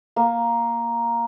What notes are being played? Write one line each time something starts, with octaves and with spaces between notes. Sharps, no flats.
A#3